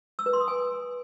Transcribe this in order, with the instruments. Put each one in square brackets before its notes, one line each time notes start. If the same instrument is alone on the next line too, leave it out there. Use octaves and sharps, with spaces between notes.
[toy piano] E6
B4
C6
D#6
G#5